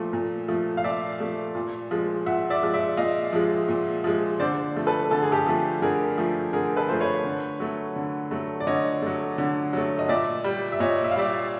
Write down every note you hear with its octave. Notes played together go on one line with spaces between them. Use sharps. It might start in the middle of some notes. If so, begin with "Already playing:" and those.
Already playing: A#2 F3 A3
A#2
F3 A3
F5
A#2 D5 E5
F3 A3
A#2
F3 G#3
A#2 E5 F#5
D5 E5
F3 G#3
D5 E5
A#2 D#5 F5
F3 G#3
A#2
F3 G#3
D3 C5 D5
F3 A3
A4 B4
D3 A4
G#4
G4 A4
F3 A3
D3 G#4 A#4
F3 A3
D3 G#4 A#4
A4 B4
F3 A3 C5
B4 C#5
D3
F#3 A3
D3
F#3 A3
D5
D3 C#5 D#5
F#3 A3
D3
F#3 A3
D#5
A#2 D5 E5
G3
E5
A#2 C#5 D#5
E5
F5
G3 D5 E5